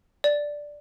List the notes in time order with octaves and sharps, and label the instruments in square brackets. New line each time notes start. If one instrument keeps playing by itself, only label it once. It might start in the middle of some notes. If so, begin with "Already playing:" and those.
[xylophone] D5